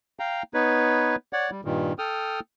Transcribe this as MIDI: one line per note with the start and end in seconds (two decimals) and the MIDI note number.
0.19 0.43 77
0.19 0.43 79
0.19 0.43 82
0.54 1.16 59
0.54 1.16 63
0.54 1.16 71
0.54 1.16 73
1.33 1.50 73
1.33 1.50 74
1.33 1.50 78
1.51 1.61 55
1.65 1.93 43
1.65 1.93 46
1.65 1.93 51
1.99 2.40 69
1.99 2.40 79
1.99 2.40 87
1.99 2.40 89